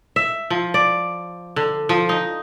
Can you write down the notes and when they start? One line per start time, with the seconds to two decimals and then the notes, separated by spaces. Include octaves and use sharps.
0.16 E5
0.50 F3
0.74 D5
1.56 D3
1.89 F3
2.09 D#4